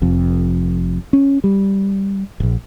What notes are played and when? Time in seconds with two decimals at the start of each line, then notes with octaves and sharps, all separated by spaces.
0.02 F1 F2
1.13 C#4
1.44 G3
2.40 E1 A#1